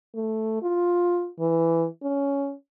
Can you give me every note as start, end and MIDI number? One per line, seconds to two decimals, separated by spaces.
0.15 0.60 57
0.62 1.30 65
1.40 1.86 52
2.03 2.53 61